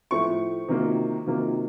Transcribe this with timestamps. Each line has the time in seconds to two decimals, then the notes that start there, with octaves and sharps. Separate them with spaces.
0.11 A2 F3 A3 C#6
0.68 C3 D#3 F#3 A#3 F4
1.27 C3 D#3 F#3 A#3 F4